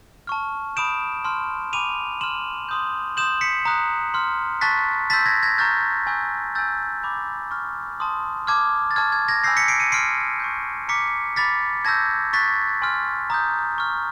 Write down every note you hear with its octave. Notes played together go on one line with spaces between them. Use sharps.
A5 C#6 F6
B5 D#6 G6 D7 E7
A5 C6 F6
G#5 B5 D6 D#7 F7
C6 F6 E7 F#7
C6 D#6 G6
C6 D#6 G6 E7 F#7
B6 C#7
A#5 D#6 F#6
C6 F6
A5 C#6 F#6 A6 B6
A5 C6 E6 G6 A6 B6
G#6 A#6
G#6 A#6
A#5 C#6 F6 G6 A6
G#5 C#6 E6 G6
G#5 C#6 E6 G6 A6
B5 D6 G6
C#6 F6
A5 C6 D#6
A5 D6 F6 G#6
A6
A5 C#6 F6 G#6
G#6
G#6 A#6
G#5 B5 E6 G6 A#6 C7
B6 C#7
C7 D7
C#7 D#7
C6 F6 C7 D7
C#6 E6 G6
A#5 D6 F6 B6 C#7
B5 D6 F6 A6 B6
A5 C#6 E6 G6 G#6 A#6
C#6 F#6 A6 B6
G#5 C6 F6
A#5 D#6 G6
C#6 F6